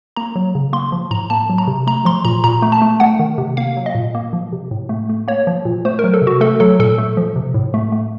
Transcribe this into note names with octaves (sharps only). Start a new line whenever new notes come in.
A#3 A#5
F#3
C#3
A#3 C6
F3
A2 A#5
A#3 A5
F#3
A#5
C3
A3 A#5
F3 C6
A#2 A#5
A#2 A#5
A3
A5
A3
A3 F#5
D#3
C3
A#3 F5
F#3
D#5
A#2
A#3
F3
C3
A2
A3
A3
A#3 C#5
F3
A#2
A3 C5
A#4
F#3
A4
C3
F#4
A3 A4
F#3 A4
A#2 A4
A3
F3
C3
A2
A3
A3